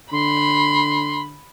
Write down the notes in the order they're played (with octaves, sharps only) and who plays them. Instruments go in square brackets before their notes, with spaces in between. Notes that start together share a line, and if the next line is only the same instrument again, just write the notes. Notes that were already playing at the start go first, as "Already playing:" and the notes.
[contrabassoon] D3 [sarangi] B5 [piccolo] C6